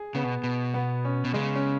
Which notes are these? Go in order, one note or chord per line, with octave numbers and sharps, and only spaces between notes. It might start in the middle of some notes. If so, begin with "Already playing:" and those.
Already playing: G#4
C#3 B3
B2
B2
B3
C#4
B2
C#3 G#3
C#4